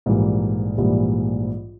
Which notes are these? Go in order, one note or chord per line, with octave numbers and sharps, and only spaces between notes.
A#1 G#2 E3 G3 A#3
A#1 G#2 E3 G3 A#3